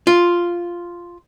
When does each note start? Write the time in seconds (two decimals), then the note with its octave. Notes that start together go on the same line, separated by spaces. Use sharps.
0.07 F4